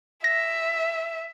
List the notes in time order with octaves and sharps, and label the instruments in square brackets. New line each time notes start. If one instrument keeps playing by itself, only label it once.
[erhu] E5 [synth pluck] A#6